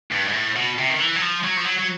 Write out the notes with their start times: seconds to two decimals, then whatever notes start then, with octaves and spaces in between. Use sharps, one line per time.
0.12 G2
0.28 G#2
0.34 A2
0.56 B2
0.78 C3
0.89 D#3
1.00 E3
1.15 F#3
1.21 F3
1.44 F#3
1.57 F3
1.66 F#3
1.79 F#3